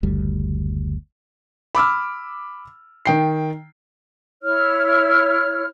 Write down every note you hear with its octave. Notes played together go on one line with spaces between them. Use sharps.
F#1 D2 G3
B5 D6 E6 F6
D#3 G5 C7
E4 C#5 F6